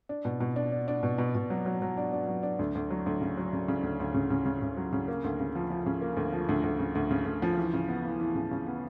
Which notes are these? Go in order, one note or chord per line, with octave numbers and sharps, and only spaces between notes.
D4
B2
B2
D4
D4
D4
B2
B2
B2
F#3
F#3
F#3
D4
D4
F#3
D4
D2
D2
F#3
D2
C#3
F#3
C#3
C#3
D2
D2
C#3
C#3
C#3
C#3
F#3
C#3
A#3
D2
C#3
F3
F3
C#3
A#3
D2
F3
D2
D2
C#3
D2
C#3
D2
F3
E3
C#3
B3
E3
E3
C#3
C#3
B3